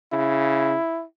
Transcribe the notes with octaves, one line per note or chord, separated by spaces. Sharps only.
C#3 E4